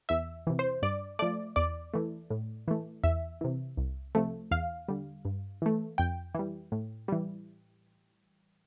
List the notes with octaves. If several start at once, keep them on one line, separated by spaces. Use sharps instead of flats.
E2 E5
C3 E3
C5
G2 D5
F3 A3 D5
E2 D5
E3 A3
A2
E3 A3
E2 E5
C3 E3
C2
C3 F3 A3
E2 F5
D3 G3
G2
E3 A3
F2 G5
E3 G3
A2
E3 G3